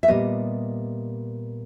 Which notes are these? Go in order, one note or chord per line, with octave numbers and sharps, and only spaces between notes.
E5
A#2 G3 B3 D#5